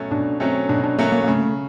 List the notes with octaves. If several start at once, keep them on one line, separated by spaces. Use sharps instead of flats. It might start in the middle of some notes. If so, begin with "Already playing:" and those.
Already playing: B2 F#3 A3 C#4
B2 D4
F#3 A3 C4 C#4
B2 D4
D4
F#3 A3 A#3 C#4
A#3
A#3
C#3 A3